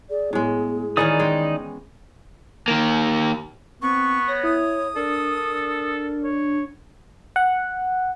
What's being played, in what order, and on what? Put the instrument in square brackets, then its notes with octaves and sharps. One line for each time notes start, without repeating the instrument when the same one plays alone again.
[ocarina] G#4 [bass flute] D5
[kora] A2 G#3 [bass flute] B3
[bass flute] D#3 [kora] E3 B3 C#4 [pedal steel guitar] D#4 D5 D#6
[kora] G#3 G#4 G5
[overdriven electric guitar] D#3 A#3
[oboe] B3 [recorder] C4 [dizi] C#6
[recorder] C#5 [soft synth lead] A#6
[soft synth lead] E4 [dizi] D#6
[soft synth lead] D4 [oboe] A4 [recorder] A#4
[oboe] C#5
[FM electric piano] F#5